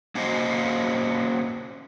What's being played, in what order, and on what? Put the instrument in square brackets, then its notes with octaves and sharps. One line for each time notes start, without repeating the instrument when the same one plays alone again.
[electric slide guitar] A#3 C#4 F#4 C5 D#5 F5